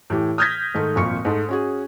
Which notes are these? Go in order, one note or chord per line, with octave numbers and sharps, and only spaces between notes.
A2 E3 G4
D#6 F6 G6 G#6 A#6 B6
G#2 D#3 A3
G#1 F2 A#2 C#6 C#7
G#2 A3
C#4 F#4 G#4